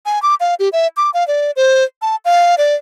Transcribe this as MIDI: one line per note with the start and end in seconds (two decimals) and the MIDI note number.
0.06 0.21 80
0.22 0.35 86
0.40 0.55 77
0.59 0.69 67
0.73 0.88 76
0.97 1.10 86
1.14 1.26 77
1.28 1.51 74
1.56 1.84 72
2.02 2.16 81
2.25 2.55 77
2.58 2.75 74